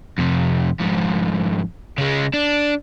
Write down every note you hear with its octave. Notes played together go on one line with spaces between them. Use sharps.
F2 C3
F2 G#2
C#3 G#3
D4